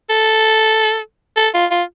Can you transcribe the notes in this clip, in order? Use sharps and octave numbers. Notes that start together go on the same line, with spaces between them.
A4
A4
F4
F4